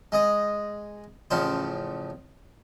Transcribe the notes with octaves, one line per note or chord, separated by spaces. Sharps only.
G#3 D#5
A1 C#3 F3 C5